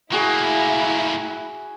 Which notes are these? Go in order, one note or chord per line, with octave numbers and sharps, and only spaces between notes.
A2 A#3 E4 F#4 G#4 C#6